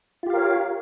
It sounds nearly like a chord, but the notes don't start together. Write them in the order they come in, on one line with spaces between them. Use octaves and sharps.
F4 G4 F5 A#4 C#5